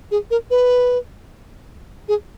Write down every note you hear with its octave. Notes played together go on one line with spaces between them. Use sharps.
G#4
A#4
B4
G#4